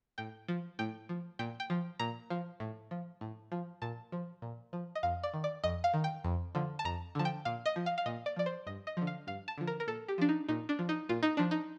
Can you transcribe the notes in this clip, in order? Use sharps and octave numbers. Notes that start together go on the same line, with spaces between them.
A2 G5
F3
A2 G5
F3
A#2 G5
G5
F3
A#2 A#5
F3
A2
F3
A2
F3
A#2 A5
F3
A#2
F3
D#5
F2 F5
D5
D#3
D5
F2 D#5
F5
D#3
G5
F2
D3 F3
A5
F2 A#5
D3 F3 A5
G5
A#2 F5
D#5
F3
F5
F5
A#2 D#5
D5
F3 D5
C5
G2 D#5
D#5
D3 F3
F5
G2 F5
A5
D3 F3
A#4
A#4
A#2 A4
G4
F3 D4
D#4
A#2 D#4
D4
F3
D#4
A#2 F4
D#4
F3 D4
D#4